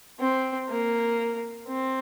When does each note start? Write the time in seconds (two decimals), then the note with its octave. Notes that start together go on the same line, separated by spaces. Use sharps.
0.20 C4
0.69 A#3
1.68 C4